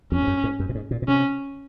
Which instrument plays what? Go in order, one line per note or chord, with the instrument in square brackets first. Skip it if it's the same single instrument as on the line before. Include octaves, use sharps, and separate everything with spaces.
[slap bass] F2 [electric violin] C#4
[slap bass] G#2
F#2
G#2
F#2
A#2
G#2
A#2
A#2
[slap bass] C3 [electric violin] C#4